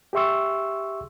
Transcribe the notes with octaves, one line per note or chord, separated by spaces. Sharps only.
G4 G#4 E5 C6 C#6 E6